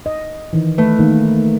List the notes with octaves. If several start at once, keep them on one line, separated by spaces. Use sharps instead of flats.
D#5
D#3 E3
A3 B4
D#3 A#3